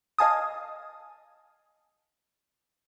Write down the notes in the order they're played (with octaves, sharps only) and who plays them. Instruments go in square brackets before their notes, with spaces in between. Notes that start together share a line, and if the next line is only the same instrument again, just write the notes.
[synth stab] D#5 F5 G#5 A5 D#6